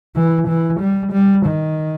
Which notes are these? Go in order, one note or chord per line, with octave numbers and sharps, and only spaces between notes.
E3
E3
G3
G3
D#3